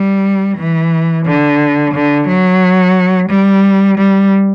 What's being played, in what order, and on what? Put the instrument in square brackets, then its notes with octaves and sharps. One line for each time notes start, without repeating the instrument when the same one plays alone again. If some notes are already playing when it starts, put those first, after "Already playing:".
Already playing: [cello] G3
E3
D3
D3
F#3
G3
G3